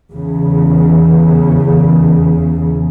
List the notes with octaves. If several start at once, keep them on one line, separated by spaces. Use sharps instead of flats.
E2 C#3